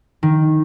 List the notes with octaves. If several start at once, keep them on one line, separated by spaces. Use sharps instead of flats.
D#3